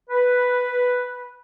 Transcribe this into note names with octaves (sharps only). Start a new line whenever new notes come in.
B4